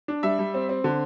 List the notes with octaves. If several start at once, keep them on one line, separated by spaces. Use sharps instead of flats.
D4
G3 E5
G3
C4
C4
D3